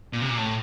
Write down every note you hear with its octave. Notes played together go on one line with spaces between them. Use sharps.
A#2
C3
A#2
A2